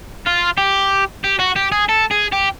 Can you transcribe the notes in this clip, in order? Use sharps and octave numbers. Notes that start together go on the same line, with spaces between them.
F4
G4
G4
F#4
G4
G#4
A4
G#4
G4